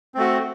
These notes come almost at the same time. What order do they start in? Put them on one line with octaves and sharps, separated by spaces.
C4 A3 F#4